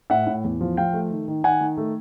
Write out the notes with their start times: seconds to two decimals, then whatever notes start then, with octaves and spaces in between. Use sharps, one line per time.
0.10 A2 E5 F#5
0.27 A2
0.44 E2
0.61 F3
0.77 F3 F5 G5
0.93 A3
1.10 D#3
1.28 D#3
1.44 D#3 F#5 G#5
1.61 D#3
1.77 A3